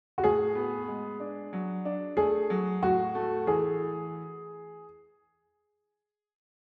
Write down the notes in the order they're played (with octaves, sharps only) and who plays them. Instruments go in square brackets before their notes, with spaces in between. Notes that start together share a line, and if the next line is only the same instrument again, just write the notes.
[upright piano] F#4
[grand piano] A2 [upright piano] G#4
[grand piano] B3
G#3
D4
F#3
D4
[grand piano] A3 [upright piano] G#4
[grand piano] F#3
[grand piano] A2 [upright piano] F#4
[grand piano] A3
[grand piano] E3 [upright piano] G#4